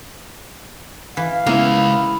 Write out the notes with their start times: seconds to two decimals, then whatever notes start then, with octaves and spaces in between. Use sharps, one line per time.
1.17 E3 F5
1.46 C#3 G#3 A#3 B3 C#4 E4